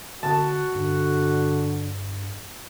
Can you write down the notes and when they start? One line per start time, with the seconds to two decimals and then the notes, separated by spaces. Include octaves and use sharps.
0.23 D3 F#4 A5
0.75 G2 D3